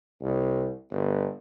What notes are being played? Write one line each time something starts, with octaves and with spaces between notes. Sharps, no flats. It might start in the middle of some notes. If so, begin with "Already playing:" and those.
C2
G1